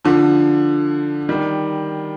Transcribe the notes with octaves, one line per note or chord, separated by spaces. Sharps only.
D3 F3
D#3 G3